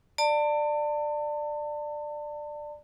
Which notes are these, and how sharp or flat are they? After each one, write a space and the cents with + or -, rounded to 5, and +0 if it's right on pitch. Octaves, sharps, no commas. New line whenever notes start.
D5 +15 A5 +35